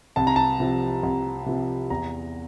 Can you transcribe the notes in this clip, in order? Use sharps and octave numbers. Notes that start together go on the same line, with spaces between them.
C2 A5
A#5
A5
C3 F3
C2
C3 F3
E2 A#5